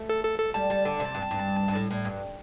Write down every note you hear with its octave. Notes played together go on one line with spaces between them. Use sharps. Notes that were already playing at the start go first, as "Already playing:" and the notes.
Already playing: A3
A4
A4
A4
G3 A5
G3
D3
C3
G2
G2
G2
A2
A2
G2